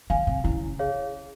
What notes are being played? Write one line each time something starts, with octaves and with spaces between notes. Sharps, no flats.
D3 F5 G#5
C3
C#3 E4
G#4 C#5 F5